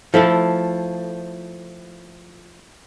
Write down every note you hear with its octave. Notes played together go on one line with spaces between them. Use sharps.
F3 A3 E4 A4